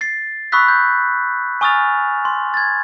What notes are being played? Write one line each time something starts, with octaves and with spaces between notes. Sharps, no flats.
A6 C7
B5 C#6 D#6 E6 F#6 B6
G6
G#5 C#6 D#6 F6 A6 F7
C6
G#6 A6